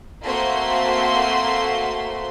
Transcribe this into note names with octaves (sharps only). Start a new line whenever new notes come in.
A3 A#3 C4 F#4 C6